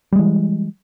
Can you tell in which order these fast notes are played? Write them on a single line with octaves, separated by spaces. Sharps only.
G3 G#3 E3